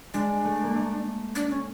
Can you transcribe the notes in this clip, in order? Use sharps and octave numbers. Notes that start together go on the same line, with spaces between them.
G#3 D4
A3
A#3
A3
D4
C#4